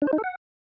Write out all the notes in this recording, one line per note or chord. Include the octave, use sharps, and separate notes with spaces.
D4
C5
D#4
A4
F#5